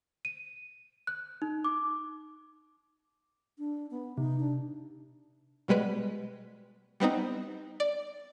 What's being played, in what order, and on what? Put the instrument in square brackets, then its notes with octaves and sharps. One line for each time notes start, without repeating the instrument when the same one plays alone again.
[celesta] D#7
F#6
D#4
D6
[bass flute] D4
B3
[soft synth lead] C3 [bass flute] D#4
[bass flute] D4
[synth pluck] B2 G3 G#3 B4
G3 B3 C4 D#4
D5